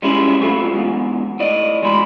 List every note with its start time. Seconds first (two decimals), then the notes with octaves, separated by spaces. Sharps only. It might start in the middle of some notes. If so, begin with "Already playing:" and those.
0.02 G3 G#3 C#4 E4 G#4
0.39 C3 F#3 A3 F4
0.73 E2 G#2
1.40 A2 D5 D#5
1.82 E3 G#3 F#4 B5